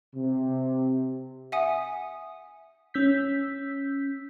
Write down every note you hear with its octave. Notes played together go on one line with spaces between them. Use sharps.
C3
E5 F#5 G#5 D#6
C#4 E6 G6 B6